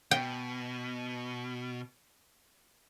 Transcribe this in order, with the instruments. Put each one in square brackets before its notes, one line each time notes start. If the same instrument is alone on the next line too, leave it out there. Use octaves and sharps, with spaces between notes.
[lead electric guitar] B2 [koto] G5